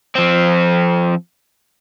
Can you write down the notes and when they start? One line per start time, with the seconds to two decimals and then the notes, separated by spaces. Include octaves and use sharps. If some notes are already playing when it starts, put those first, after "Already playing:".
0.15 F3 C4